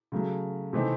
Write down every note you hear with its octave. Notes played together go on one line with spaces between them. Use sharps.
C#3 F#3 A3
C3 E3 A3 C4 D#4